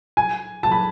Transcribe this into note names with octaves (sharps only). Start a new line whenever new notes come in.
G#5
A5
B5